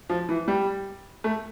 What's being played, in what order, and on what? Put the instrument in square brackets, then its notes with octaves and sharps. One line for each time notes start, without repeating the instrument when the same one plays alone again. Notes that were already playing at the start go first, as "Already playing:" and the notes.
[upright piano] F3
E3
G3
A3